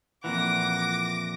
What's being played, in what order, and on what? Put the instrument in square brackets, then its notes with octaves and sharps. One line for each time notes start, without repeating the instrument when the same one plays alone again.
[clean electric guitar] F2 A#2 E3 [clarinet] F#5 [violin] D6 A#6